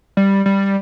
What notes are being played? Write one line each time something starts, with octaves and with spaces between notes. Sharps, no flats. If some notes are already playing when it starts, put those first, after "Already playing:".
G3
G3